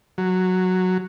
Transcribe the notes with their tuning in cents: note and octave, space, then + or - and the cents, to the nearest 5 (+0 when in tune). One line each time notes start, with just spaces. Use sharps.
F#3 -5